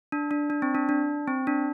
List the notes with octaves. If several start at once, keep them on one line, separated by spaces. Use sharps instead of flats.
D4
D4
D4
C4
D4
D4
C4
D4